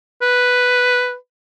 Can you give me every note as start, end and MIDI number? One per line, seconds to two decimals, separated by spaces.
0.22 1.15 71